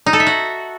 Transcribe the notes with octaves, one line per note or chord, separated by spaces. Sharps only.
D#4
A4
E5
F#4